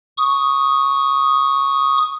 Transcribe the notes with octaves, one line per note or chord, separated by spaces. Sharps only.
C#6 D#6